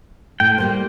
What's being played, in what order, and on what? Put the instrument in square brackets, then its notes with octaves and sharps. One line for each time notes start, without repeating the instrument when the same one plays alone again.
[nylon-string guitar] A2 [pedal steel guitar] G5
[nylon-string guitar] G3 A#3 C5